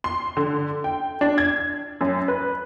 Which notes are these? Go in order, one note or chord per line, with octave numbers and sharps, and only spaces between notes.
C6
D3
G5
D4
G#6
F#2
B4